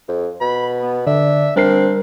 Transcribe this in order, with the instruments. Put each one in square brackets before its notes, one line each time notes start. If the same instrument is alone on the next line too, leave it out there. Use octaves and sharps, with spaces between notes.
[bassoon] F2
[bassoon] B2 [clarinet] B5
[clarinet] B3
[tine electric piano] D3 [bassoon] D4 [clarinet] E5
[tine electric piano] G3 A#4 C7 [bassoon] C4 [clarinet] D4